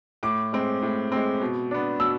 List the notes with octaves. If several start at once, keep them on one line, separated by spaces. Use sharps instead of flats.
A2 D6
G#3 C4
A2
G#3 C4
B2
B3 D4
B2 E6